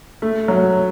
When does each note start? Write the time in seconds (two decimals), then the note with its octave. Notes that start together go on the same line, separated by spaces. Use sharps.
0.22 A3
0.48 F#3